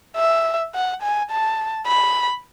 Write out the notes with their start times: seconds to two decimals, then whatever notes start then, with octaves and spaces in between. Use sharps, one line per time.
0.17 E5
0.74 F#5
1.02 G#5
1.31 A5
1.87 B5